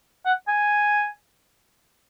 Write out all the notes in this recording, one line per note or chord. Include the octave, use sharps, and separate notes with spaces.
F#5
G#5